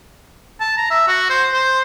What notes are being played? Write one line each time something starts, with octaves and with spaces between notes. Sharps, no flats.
A5
A#5
E5
F#4
C5
C5